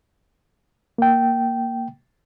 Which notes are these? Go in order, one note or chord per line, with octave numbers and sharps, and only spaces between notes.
A#3 G5